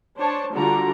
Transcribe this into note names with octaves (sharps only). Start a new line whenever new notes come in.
D4 C5 C#5 A5
D3 G3 F4 F#4 A#5